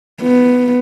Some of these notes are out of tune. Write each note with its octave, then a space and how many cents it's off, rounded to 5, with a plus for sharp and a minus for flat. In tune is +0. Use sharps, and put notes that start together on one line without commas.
B3 +5